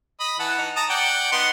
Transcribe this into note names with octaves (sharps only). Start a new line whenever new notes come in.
D#5 B5
E3 F#5 A5
D#4
A5 A#5 D#6
D5 F#5 G5
B3 D#4 C6